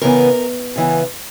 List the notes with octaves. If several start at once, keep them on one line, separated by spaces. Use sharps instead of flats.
C#3 E3 B3 A#4
C#3 E3 B3